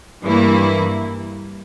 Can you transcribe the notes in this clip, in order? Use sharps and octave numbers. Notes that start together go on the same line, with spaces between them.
G2 E3 A#3 E4